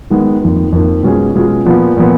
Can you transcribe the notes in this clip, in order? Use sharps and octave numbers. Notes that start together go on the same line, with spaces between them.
D#3 G#3 B3
F2 D#3 A#3
F2 D#3 A#3
B2 G#3 C#4 F4 G#4
B2 G#3 C#4 F4 G#4
A#2 F3 B3
A#2 F3 B3